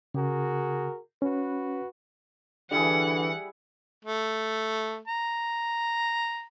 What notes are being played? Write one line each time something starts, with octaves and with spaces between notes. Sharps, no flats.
C#3 F#4 G#4 A#4
C#4 F#4 B4
D3 E3 G3 E4 G#4 F#5
A3
A#5